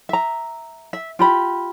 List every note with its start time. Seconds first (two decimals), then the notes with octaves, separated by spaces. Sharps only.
0.09 E5 A#5
0.93 E5
1.19 F4 G4 B5